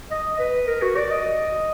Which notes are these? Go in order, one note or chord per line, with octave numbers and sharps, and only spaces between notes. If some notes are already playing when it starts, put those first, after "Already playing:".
D#5
B4
A#4
F#4
D5
D#5